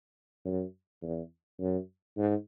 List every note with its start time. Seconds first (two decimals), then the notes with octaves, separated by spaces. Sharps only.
0.45 F#2
1.02 E2
1.60 F#2
2.17 G#2